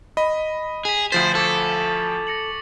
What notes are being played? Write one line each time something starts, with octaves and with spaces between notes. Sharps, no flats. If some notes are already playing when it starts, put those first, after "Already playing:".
D#5 B5
G#4 B6 E7 F7
D2 F3 C5 A6 B6 E7 F#7
A4 C#6 D6 G#6
A#6 C#7 F#7